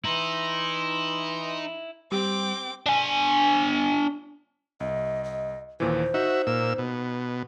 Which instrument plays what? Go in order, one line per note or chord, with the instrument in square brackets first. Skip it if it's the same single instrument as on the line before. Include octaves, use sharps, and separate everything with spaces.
[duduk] E3 [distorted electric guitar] D#4 [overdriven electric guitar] E4 [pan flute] C6
[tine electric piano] G3 [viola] C4 G5 [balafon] G4 [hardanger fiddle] D6
[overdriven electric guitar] D4 G#5
[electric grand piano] C2 [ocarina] D#5
[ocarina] D#5
[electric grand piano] D#2 A#2 E3 [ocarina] C5
[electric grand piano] D#4 [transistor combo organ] F#4 E5
[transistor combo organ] A#2 E6
B2